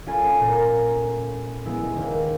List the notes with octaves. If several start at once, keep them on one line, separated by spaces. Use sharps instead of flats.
C#4 F4 A4 G#5 B5
A#2 A#5
G#3 B3 E4
D#2 D#3